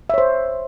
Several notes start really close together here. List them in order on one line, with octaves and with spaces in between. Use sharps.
E5 C#5 C5